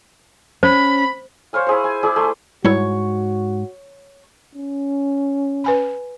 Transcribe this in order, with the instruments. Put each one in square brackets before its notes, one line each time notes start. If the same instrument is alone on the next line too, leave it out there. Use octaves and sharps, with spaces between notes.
[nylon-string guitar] C#4 [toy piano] C5 [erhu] B5
[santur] C5 C#5 F5 G#5
E4 G#4 C5
G#5
E4 G#4 D5
A3 C6
[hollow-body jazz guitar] G#2 [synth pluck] G3 E4 [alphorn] F#4 [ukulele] C#5
[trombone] C#4
[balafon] B4 G#5 B5